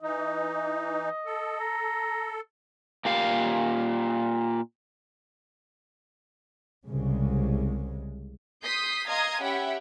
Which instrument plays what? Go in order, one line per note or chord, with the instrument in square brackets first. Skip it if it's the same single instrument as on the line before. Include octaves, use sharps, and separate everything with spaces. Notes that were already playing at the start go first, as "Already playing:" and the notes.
[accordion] E3 D#4 [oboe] D#5
[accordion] A4
[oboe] A#5
[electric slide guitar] A#2 G4 F5
[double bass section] C2 C#3 G#3
[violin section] C6 D#6 G6 B6 C7
D#5 F5 A#5 C6 D#6 G#6
C#4 G4 E5 F#5 G5 B5